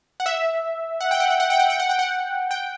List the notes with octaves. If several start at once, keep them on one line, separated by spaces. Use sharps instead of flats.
F#5
E5
F#5
G5
F#5
G5
F#5
G5
F#5
G5
F#5
G5
F#5
G5